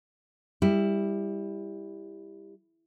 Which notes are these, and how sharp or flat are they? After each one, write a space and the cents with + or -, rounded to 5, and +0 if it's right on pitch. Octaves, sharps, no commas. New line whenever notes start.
G3 +20 E4 +0